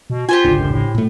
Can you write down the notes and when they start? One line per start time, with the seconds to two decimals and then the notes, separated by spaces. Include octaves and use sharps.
0.10 B2
0.29 F4 G4 C5 G#5
0.44 G#1 C#2 D3
0.58 F#2
0.70 A2
0.95 A#2 A3